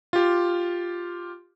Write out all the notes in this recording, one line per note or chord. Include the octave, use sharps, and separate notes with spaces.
F4 G4